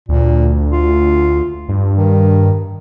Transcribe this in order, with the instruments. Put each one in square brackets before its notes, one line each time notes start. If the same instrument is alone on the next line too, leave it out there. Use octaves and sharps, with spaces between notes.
[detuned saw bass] D2 [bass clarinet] A#2
[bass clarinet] F4
[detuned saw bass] G2
[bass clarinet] D#3